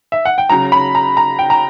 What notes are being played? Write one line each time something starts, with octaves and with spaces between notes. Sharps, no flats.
E5
F#5
G5
C#3 F#3 A#5
B5
A#5
A#5
G5
A#5